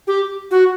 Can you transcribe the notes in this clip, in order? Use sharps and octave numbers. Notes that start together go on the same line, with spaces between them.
G4
F#4